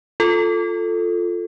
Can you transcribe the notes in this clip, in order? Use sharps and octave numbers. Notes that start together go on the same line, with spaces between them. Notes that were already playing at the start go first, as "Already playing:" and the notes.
F4 A4